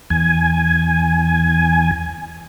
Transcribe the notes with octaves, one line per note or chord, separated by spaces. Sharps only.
E2 G#5